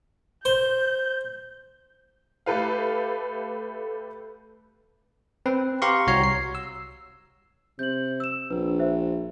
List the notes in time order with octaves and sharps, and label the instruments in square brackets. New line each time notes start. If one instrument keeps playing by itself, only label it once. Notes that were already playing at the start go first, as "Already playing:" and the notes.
[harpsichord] C5 [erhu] G6
[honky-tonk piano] A3 G4 A4 B4 F5
[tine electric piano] C4 B4
G4 F5 A#5 C6 C#6
C2 F#4 C#5 A#5 C7
C7
E6
[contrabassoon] C3 [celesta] G6 F#7
[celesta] E6 E7
[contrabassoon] A#1 [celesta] B4
[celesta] C5 E5